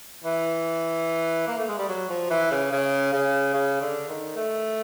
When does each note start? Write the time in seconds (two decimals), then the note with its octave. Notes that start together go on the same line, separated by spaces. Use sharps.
0.24 E3
1.48 A#3
1.57 A3
1.68 G#3
1.78 G3
1.89 F#3
2.09 F3
2.30 E3
2.51 C#3
2.72 C#3
3.13 C#3
3.54 C#3
3.81 D3
4.09 D#3
4.36 A3